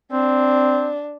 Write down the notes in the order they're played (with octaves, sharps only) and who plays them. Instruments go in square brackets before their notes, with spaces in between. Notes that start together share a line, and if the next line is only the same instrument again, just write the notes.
[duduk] C4 [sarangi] D4